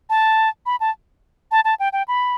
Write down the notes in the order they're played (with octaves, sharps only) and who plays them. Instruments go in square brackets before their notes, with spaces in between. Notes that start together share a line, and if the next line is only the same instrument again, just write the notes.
[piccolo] A5
B5
A5
A5
A5
G5
G5
B5